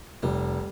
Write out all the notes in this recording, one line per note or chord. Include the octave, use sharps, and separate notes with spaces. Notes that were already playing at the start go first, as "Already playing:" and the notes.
F1 G3